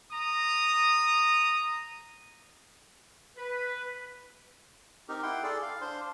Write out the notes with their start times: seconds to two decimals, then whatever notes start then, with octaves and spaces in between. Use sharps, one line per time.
0.12 A#5 D#6
3.37 B4
5.09 C4 D#4 G4 A#4
5.23 E4 F#5 G5 C6
5.43 G#4 A4 D5
5.62 F5
5.81 D4 C5 C6